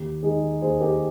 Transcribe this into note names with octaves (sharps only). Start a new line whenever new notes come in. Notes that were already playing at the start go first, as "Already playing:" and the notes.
Already playing: D#2 G4
D#3 G#3 D#4 G#4
D#2 G#4 C5
G4 A#4